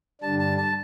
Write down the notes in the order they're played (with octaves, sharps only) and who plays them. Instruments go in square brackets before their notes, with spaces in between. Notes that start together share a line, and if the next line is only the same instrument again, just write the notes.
[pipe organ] G2 D3 G3 D4 [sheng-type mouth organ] A5
[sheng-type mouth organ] A5
A5